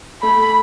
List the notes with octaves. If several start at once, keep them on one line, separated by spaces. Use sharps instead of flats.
A3 B5